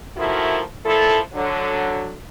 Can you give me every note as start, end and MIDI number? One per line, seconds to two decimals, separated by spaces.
0.17 0.60 51
0.17 0.60 53
0.17 0.60 57
0.17 0.60 64
0.17 0.60 66
0.17 0.60 70
0.84 1.17 46
0.84 1.17 53
0.84 1.17 64
0.84 1.17 69
1.34 2.14 50
1.34 2.14 54